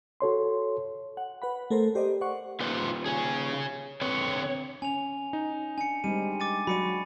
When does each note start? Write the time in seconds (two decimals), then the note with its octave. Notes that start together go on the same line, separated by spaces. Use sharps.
0.21 F#4 A4 C#5 C6
1.17 F#5
1.42 B4 F#5 B5
1.70 A3 A4 A#4 C5
1.95 G4 C5 D5 D#5
2.21 C5 D5 F#5 C#6
2.60 A#2 D#3 F4 B4 C5
3.06 G#4 C#5 G#5
4.01 D3 C4 B4 C#5
4.82 C#4 G#5 F7
5.33 D#4
5.78 D4 G#5 C#7
6.04 G3 G#3 C4 D#4 D#7
6.40 D6 A6 D#7
6.67 F#3 F#4 D5 B5 C#7 D#7